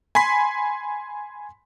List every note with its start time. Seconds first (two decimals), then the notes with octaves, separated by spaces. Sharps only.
0.15 G#5 B5 C6 B6